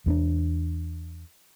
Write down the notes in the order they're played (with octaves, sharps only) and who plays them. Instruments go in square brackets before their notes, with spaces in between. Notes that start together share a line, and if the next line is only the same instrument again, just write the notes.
[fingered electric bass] E2 C4 D4